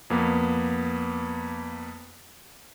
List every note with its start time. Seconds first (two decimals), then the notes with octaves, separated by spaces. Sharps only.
0.10 F2 A#3 B3